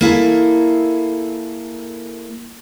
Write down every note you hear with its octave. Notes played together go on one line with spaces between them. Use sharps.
A#3 E4 G#4 A4